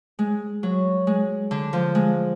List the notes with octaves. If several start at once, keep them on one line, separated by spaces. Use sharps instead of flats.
G#3
F#3
G#3
D3
F3
G#3